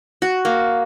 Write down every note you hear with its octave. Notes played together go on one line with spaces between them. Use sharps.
F#4
A#3